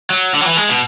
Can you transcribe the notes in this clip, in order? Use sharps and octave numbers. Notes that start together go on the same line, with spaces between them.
F#3
D3
F#3
E3
G#3
B2